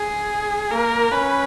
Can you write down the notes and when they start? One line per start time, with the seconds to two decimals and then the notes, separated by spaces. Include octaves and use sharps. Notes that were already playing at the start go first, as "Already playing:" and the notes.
Already playing: G#4
0.71 A#3 A#4
1.12 C#4 B4